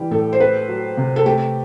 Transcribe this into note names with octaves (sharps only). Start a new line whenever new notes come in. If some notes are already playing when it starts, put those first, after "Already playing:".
Already playing: E3 G3 G4
A2 A4
C5
A3 B4
F#3
C3
A4
A3 G4